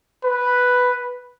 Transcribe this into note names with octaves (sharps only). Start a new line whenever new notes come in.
B4